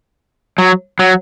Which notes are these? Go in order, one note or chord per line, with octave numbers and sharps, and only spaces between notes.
F#3
F#3